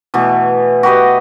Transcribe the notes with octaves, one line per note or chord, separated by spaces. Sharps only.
B2 E3 A3 B3
F#4 G4 B4 D#5